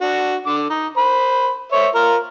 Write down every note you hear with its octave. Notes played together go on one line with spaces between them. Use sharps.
D4 F#4
D3 D6
D#4
C5 B5
C5 C#5 E5
F4 A#4